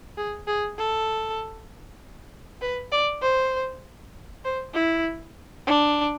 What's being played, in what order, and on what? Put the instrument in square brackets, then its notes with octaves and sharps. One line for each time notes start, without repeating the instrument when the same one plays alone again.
[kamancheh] G#4
G#4
A4
B4
D5
C5
C5
E4
D4